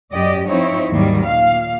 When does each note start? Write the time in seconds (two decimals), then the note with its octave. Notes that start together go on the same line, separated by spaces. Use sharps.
0.13 F#2 G4 D5 D#5
0.48 F3 C4 D#4 E4 C#5
0.91 D#2 G#2 D#3 F#3 G3
1.25 A#2 F5